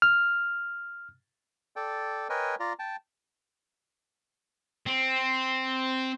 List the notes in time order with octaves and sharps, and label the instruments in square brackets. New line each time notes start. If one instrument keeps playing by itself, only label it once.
[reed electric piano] F6
[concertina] A4 D5 G5
A#4 B4 C#5 D#5 G5 G#5
F4 D5 A#5
G5 A5
[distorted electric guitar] C4